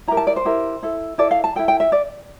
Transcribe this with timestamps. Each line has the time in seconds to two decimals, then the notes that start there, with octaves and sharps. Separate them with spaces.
0.08 E4 A#5
0.11 G4 A#4
0.17 A5
0.27 D5
0.36 C5
0.45 E4 G4 A#4
0.83 E4 A4
1.18 E4 A4 D5
1.31 F5
1.44 A5
1.56 E4 A4 G5
1.68 G5
1.80 E5
1.92 D5